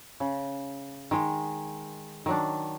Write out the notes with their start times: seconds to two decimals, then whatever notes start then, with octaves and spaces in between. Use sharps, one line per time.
0.20 C#3
1.11 D#3 G#3
2.26 D#3 F#3 D4